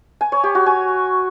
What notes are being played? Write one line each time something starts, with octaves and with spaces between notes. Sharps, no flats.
G#5
C#5
G4
F#4
G#5